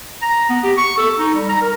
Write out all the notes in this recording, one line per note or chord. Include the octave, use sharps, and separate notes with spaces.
A#5
B3
G4
C#6
A4
D#4
G3
A#5
A#4